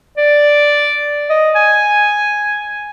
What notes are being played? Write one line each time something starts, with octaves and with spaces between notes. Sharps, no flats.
D5
D#5
G#5